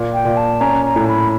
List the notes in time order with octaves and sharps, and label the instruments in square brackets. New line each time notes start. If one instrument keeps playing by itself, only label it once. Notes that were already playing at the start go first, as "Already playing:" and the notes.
Already playing: [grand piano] A#2
[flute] G5
[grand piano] A#2
[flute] A5
[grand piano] C#4 [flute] A#5
[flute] A#5
[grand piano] A2
[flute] B5